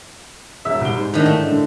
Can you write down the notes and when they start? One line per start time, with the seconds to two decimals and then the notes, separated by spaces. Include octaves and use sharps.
0.65 E1 E5 E6
0.81 C2 D7 G7
0.95 G#2 C5
1.14 A2 D3 D#3
1.26 A3
1.47 D3